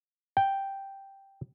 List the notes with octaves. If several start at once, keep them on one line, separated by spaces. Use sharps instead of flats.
G5